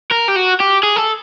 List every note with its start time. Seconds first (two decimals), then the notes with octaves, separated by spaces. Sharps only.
0.11 A#4
0.28 G4
0.36 F#4
0.60 G4
0.83 G#4
0.97 A4